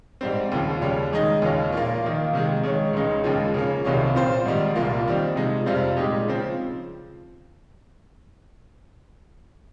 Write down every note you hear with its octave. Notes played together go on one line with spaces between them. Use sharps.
G#2 G3 C4
D#2 C#3 F3
D#2 C#3 G3 C#4
D#3 G#3 D#4
D#2 C#3 G#3 C#4 F4
A#2 F3 A#3
D#3 A#3 F4
C3 D#3 G#3
D#3 G#3 C#4
C#2 C#3 G#3 D#4
D#2 C#3 F3 G#3
C#3 F3 A#3 C#4
C2 C3 D#3 A#3 C#4
A#2 F3 C4 F4 C5
G#2 D#3 G3
C2 A#2 F3 A#3
D#3 G3 C4
C3 F3 G#3 D#4
F2 C3 G3 C4 F4
A#2 G#3 D#4 G4
C#3 F3 C4